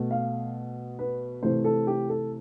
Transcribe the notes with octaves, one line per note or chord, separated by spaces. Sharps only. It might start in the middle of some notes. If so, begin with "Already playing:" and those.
Already playing: B2 A3
F5
B4
C3 E3 A3 C5
A4
G4
A4